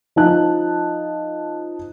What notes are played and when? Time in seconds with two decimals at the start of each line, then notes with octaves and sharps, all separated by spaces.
0.16 F3 D#4 A5 F#6